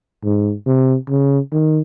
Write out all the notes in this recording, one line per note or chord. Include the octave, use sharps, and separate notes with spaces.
G#2
C3
C#3
D#3